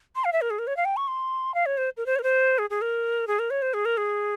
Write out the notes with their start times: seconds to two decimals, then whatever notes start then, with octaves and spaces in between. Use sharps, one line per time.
0.16 C6
0.24 F5
0.33 E5
0.41 A#4
0.50 G#4
0.59 A#4
0.67 C#5
0.77 F5
0.85 G5
0.97 C#6
1.08 C6
1.54 F5
1.66 C#5
1.77 C5
1.97 A#4
2.06 C5
2.15 C#5
2.19 A#4
2.23 C5
2.58 G#4
2.70 G#4
2.81 A#4
3.27 G#4
3.39 A#4
3.50 C#5
3.62 C5
3.74 G#4
3.85 A#4
3.97 G#4